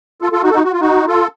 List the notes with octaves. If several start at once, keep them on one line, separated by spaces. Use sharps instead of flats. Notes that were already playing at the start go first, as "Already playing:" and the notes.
F4 A4
F4 A4
D#4 F#4
A4
D#4 F#4
F#4
F4
D#4 F#4
F4 A4